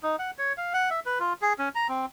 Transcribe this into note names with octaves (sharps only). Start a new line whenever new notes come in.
D#4
F#5
C#5
F5
F#5
E5
B4
F4
G#4
C#4
A#5
C4